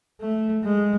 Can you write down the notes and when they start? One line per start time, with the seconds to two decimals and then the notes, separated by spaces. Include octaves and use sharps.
0.21 A3
0.64 G#3